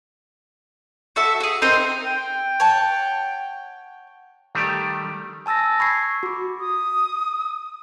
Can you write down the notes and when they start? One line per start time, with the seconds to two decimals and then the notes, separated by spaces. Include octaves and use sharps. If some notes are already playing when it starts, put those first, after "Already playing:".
1.16 F#4 A4 E5
1.40 F#4 G#4
1.62 C4 D#4 A#4 C5
2.06 G5
2.60 C#5 F#5 A5
4.55 D#3 G3 A3 G4
5.46 G#5 A5 E6 A6 A#6
5.80 B5 C#6 E6 G#6 B6 C7
6.23 F#4 D6
6.60 D#6